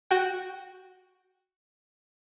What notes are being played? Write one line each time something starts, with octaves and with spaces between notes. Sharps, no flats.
F#4 G5